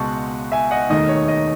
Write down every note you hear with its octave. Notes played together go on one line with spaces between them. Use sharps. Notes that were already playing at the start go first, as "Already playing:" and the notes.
Already playing: C#2 B2 G#3 F#5 A5 C#6
E5 G#5
D#5 F#5
E1 D#2 D#3 A3 D#5
C#5
D#5